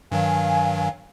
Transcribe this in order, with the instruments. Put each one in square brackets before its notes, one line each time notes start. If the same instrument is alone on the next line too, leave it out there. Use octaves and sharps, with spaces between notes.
[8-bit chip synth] G2 D#3 F#3 [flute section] F5 G#5